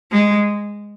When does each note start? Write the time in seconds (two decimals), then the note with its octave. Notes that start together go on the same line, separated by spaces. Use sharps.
0.12 G#3